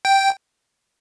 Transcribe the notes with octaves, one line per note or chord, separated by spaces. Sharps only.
G5